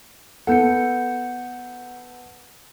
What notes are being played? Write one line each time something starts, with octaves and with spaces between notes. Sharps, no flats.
B3 A4 F#5 G6 C#7